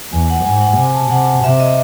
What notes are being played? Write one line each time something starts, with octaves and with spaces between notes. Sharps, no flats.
E2 G#5
F#5
G#2 G#5
F#5
C3 G#5
A5
C3 F#5
C3 E5
D#5